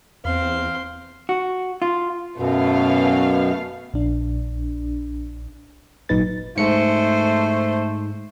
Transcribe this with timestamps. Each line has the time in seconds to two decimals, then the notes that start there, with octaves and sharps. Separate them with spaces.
0.25 E2 C4 F5 C6
1.29 F#4
1.82 F4
2.38 F#2 B2 A3 B3 F5
3.94 A#1 D4
6.09 G#1 A#2 F#3 D#4 B4 A6
6.57 G#2 A3 C5 C#7